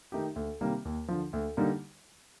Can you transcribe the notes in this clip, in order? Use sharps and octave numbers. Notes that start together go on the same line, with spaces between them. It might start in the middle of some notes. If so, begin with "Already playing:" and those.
D#3 A3 D#4 G4
D2
C3 D#3 G3 A#3
D#2
D3 F3
D2
D3 G3 A#3 D#4